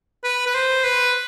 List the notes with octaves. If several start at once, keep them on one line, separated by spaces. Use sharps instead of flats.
B4
B4
C5
B4